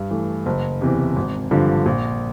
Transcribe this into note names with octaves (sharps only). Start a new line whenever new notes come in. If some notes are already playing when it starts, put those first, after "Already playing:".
Already playing: G2
E3 A3
F#1
E2 C3 E3
G#1
G2 D3 F3
A#1